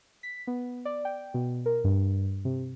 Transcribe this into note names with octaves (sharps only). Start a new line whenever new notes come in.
B6
B3
D5
G5
B2
A#4
G2
C3